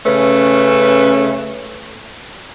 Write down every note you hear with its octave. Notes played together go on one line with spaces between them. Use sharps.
C#3 A3 C#4 B4